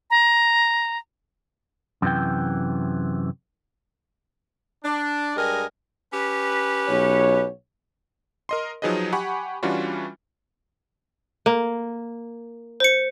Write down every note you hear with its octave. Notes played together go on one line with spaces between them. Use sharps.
A#5
F#2 C3 E3 G5
D4
G2 G3 G#3 A#4 D#5 G#5
C#4 G4 B4
B1 C#5
A#4 D#5 C6
F3 F#3 D#4 G#4 B4 D#5
G4 F#5 G#5 B5 C#6
E3 G3 C#4 D4 F4 F#4
A#3
C5 C#7